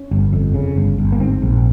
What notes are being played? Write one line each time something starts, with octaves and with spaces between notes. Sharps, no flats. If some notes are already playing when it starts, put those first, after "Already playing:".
Already playing: C#4
G1
F2
C#3
G1
G1
A#3
G#2 C4
A#1